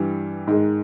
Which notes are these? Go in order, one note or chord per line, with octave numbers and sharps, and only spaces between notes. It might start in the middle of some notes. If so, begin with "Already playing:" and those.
Already playing: G2 E3 G3
G#2 D#3 G#3